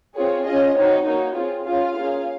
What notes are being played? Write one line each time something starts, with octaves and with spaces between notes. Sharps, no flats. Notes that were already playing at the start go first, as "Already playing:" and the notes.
C4 F4 G#4 C#5
C#4 F4 G#4 D#5
C4 D#4 F#4 C#5
A#3 D#4 F#4 C#5
C4 F4 G#4
C#4 F4 G#4 F5
A#3 C#4 F4 G#4